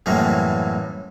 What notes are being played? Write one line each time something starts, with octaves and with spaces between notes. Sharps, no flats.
F#2 A2 E3 G3 A#3 C4